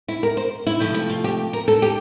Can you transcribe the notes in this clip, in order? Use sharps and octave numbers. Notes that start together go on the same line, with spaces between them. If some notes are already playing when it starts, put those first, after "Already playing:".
E4
A#4
C5
E4
C3 F3 A3 E4
E4
F4
G4
A#4
A4
G4